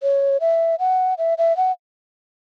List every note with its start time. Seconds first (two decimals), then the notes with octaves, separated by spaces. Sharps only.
0.03 C#5
0.41 E5
0.79 F#5
1.18 E5
1.38 E5
1.57 F#5